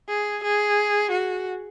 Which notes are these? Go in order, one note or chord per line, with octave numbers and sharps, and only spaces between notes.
G#4
G#4
F#4